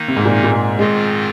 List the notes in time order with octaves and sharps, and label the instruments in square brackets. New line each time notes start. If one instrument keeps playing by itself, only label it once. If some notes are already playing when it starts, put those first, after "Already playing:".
Already playing: [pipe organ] D#3 A#3 D#4
[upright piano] C3
G#2
A#2
A#2
G#3
[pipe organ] G#2 D#3 C4 F4 [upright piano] G#3